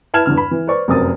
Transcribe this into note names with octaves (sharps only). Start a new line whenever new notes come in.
E4 B4 A5 F6 G#6 E7
E2 G2 D3 F6
B5
E3
B4 C5 D5 C#6
F1 F#2 C4 A#4 D#6 A6